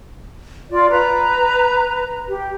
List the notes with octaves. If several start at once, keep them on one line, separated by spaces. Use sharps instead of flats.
F4 D5
B4 A#5
G4